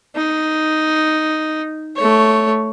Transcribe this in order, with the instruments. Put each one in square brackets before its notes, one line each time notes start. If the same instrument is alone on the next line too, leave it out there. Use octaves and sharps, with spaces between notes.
[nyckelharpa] D#4
A3 C#5